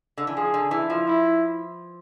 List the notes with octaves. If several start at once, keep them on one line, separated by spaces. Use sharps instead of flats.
D3
E3
F3 G#4
D3
E3 E4
F3
E4